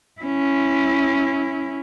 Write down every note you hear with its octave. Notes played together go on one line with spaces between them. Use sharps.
C#4 E4